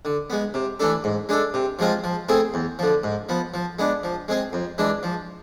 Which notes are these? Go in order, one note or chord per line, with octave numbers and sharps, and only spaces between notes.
D3
G#3 B3
C3
E3 A3 D4 A4
G#2
G#3 D4 A4
C3
F3 G#3 C4 F4
F3
A3 C4 E4 G#4
E2
D3 F3
G#2
F3 B3
F3
G#3 B3 D4
F3
G#3 C4 G#4
F2
E3 G#3 D4
F3